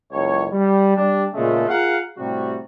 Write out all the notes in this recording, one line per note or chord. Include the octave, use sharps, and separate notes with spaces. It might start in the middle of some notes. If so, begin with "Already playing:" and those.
F#1 C#2 C#5
G3
G3 D4
A#2 C#3 G#3 A3
F4 G#4 A#4 F5 F#5
A2 C3 G3 F#4